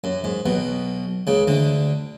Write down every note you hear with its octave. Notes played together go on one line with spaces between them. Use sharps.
F#2
G#2
B1 B2
C#2 C#3
D2 D3